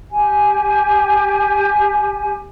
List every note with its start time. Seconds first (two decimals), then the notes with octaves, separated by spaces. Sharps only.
0.11 G4 G#5